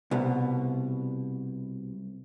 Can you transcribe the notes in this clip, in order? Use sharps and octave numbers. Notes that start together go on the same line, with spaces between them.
C2 B2